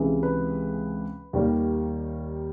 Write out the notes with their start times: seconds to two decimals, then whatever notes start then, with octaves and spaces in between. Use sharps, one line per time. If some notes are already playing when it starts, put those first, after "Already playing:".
Already playing: C#2 C3 E3 G#3
0.23 B4
1.33 D#2 D#3 G3 A#3